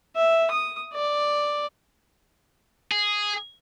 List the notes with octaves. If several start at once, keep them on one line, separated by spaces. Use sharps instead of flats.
E5
D#6
D5
G#4